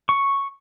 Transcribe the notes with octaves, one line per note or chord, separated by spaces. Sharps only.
C#6